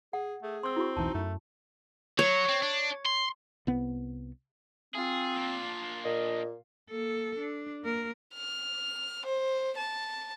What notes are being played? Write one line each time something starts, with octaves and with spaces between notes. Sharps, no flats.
G#4 F#5
A3 G#4
C4 C6 E6
E4 F#4 C#6
E1 B1 E3 D#4 A5
F#2 A3
F#3 C#5
C4
D4
C6
C2 B3
C4 F4 G#4
A#3 D4
A#2 D#5
A#3 A4
D4
A#3 A#4
F6
C5
A5